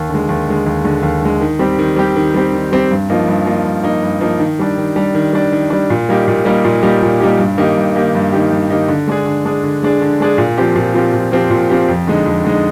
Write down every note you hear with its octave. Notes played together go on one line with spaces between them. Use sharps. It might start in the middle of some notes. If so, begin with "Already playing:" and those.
Already playing: D#2
D3
G#3
D#2
D3 G#3
D#2
D3 G#3
D#2
D3 G#3
D#3
G3 C4 G4
D#3
G3 C4 G4
D#3
G3 C4 G4
D#3
G3 C4 G4
G2
F3 A#3 D#4
G2
F3 A#3 D#4
G2
F3 A#3 D#4
G2
F3 A#3 D#4
D#3
G3 D4
D#3
G3 D4
D#3
G3 D4
D#3
G3 D4
A#2
G3 A#3 D#4 G4
A#2
G3 A#3 D#4 G4
A#2
G3 A#3 D#4 G4
A#2
G3 A#3 D#4 G4
G2
D#3 A#3 D#4 G4
G2
D#3 A#3 D#4 G4
G2
D#3 A#3 D#4 G4
G2
D#3 A#3 D#4 G4
D3
G#3 D4 G#4
D3
G#3 D4 G#4
D3
G#3 D4 G#4
D3
G#3 D4 G#4
A#2
F3 C4 G4
A#2
F3 C4 G4
A#2
F3 C4 G4
A#2
F3 C4 G4
F2
D3 G#3 D#4
F2
D3 G#3 D#4